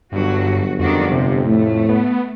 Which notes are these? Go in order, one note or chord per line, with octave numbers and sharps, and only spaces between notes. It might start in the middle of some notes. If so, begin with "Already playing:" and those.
G1 G2 F#3 F#4
F2 D#3 D4 F#4
C3
A2 A3
B3